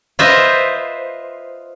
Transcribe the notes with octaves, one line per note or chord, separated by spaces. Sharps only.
F4 B4 C5 D#5 E5